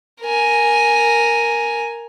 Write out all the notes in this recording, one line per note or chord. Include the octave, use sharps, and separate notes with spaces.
A#4 G#5